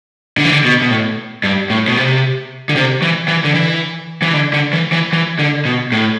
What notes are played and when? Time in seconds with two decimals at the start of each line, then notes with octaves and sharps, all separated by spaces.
0.38 D3
0.45 E3
0.52 D3
0.65 B2
0.82 B2
0.91 A2
1.44 G2
1.70 A2
1.88 B2
1.97 C3
2.69 D3
2.76 C3
3.02 E3
3.28 E3
3.44 D3
3.55 E3
4.22 E3
4.34 D3
4.53 D3
4.73 E3
4.92 E3
5.13 E3
5.39 D3
5.65 B2
5.92 A2